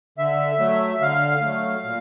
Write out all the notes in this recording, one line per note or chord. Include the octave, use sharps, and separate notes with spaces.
D3 E5
F#3 A3
D3 F5
F#3 A3
A#2